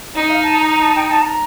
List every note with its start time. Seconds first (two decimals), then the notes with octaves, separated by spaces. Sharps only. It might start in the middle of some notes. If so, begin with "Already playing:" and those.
0.16 D#4 D#5
0.30 F5
0.43 A5
0.55 A#5
0.69 A#5
0.82 A5
0.96 G5
1.09 A5
1.22 A#5